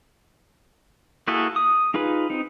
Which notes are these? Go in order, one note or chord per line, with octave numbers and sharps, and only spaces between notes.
A#3 E4 F#4 G#4 A4
D#6
D#4 F4 G#4 B4
C4 D#4